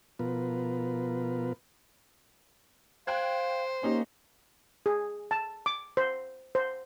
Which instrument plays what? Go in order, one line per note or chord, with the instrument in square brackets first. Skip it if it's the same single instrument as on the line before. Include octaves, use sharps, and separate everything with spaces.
[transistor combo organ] B2 F3 B3 F4 A#4 B4
[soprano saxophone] C5 [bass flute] F5 [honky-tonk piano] G5 F#6 G#6
[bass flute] A#3 [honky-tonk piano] C#4 D#4 G4
[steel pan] G#4
A5
D6
C5
C5